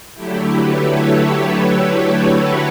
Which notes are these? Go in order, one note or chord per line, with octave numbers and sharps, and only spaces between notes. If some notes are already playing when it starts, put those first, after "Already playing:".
D3 F#3 A3 E4 G4
G4 B4
A4 C#5
G4 B4
G4
F#4